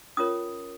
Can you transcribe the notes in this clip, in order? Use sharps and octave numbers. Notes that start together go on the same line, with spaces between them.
C#4 F4 A#4 C#5 D#6